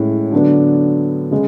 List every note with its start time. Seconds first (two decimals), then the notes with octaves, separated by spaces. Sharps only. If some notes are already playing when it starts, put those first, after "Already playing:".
Already playing: A2 G#3 C#4 E4
0.32 D3 F#3 B3 D4
1.31 C#3 G#3